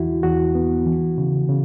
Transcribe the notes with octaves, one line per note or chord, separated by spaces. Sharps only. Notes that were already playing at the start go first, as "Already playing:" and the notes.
Already playing: E2 E3 E4 F#4
E2 F#4
B3
E3
C#3
C#3